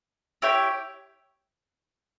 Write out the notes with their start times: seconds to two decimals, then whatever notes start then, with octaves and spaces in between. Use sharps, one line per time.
0.42 E4 G4 C#5 G5